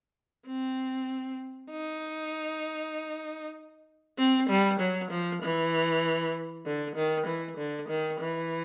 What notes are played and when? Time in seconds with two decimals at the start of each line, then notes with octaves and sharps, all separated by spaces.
0.47 C4
1.71 D#4
4.18 C4
4.49 G3
4.80 F#3
5.11 F3
5.42 E3
6.66 D3
6.96 D#3
7.27 E3
7.58 D3
7.89 D#3
8.20 E3